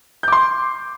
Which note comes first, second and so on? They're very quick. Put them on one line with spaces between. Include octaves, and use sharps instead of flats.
G6 D6 C6